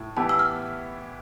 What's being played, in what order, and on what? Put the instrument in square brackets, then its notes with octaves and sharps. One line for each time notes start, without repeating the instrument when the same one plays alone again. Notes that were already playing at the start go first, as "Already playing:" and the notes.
Already playing: [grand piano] A2
[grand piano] E3 B3 E4 G4 [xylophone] A5
[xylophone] E6
F6